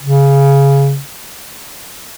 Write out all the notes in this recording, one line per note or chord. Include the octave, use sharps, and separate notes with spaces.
C#3